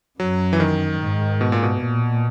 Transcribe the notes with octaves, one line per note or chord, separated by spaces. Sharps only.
F#2 F#3
E3
D#3
G#2
B2
A#2
B2
A#2